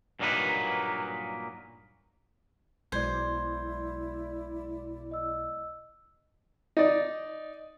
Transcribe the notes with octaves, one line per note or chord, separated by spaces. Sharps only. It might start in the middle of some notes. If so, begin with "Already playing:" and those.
G2 A#2 F#3 A#3 D#4 B4
B1 G#3 E4 C5 D5 G#6
D#5 E6
D#4 D5